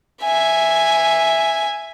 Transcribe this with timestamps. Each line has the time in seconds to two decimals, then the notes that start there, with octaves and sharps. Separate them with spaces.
0.24 E5 G#5